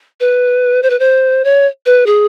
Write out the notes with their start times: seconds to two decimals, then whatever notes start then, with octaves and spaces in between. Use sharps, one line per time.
0.20 B4
0.83 C5
0.90 B4
0.99 C5
1.44 C#5
1.86 B4
2.06 G#4